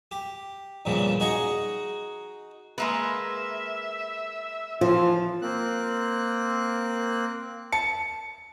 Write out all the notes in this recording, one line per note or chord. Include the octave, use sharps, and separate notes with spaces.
G4
E2 G2 A#2 C#3 F3
D#4 F#4 G#4 D#5 C#6
G#3 A#3 B4 E5
E3 F3 F4
A#3 C4 F#6
A5 C#7